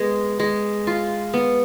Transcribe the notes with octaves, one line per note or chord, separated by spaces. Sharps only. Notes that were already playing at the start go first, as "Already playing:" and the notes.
Already playing: G#3 B3
G#3
F4
B3